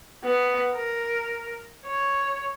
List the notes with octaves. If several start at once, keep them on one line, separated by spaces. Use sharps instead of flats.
B3
A#4
C#5